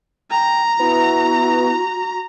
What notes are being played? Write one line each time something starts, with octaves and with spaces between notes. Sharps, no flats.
G5 A#5
B3 E4 F#4